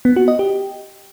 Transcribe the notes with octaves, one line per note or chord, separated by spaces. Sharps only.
B3
F#4
D#5
G4